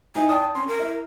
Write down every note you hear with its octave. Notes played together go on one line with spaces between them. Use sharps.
D#4 E4 G#5
D5 G5 A5 D#6
C#4 C6
A#4
E4